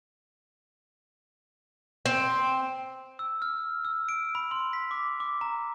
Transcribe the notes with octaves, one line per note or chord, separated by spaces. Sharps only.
C4
E6
F6
E6
D7
B5
C6
B6
D6
D6
A#5